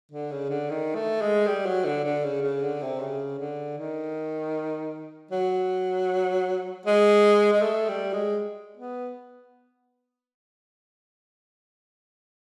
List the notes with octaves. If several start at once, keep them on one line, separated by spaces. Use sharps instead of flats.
D3
C#3
D3
D#3
A3
G#3
G3
F#3
D3
D3
C#3
C#3
D3
C3
C#3
D3
D#3
F#3
G#3
G#3
A3
G3
G#3
B3